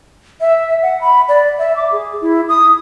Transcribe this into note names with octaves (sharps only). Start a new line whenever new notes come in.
E5
F#5
B5
D5
E5
D6
G#4
E4
D#6